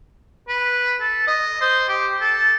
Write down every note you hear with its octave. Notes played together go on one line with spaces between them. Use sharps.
B4
A4
D#5
C5
G4
A4